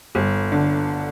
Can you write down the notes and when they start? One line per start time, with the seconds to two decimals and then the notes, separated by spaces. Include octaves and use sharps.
0.15 G1
0.52 D3